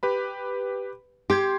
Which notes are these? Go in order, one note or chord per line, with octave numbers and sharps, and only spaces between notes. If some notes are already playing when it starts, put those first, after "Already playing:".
G4 B4 B5
G4 C6 G6 G#6